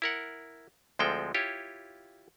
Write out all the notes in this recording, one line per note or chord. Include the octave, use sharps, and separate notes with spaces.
E4 A#4 F#5
D2 F3 G#3 C4 A4 G5
E4 F4 G4 C#5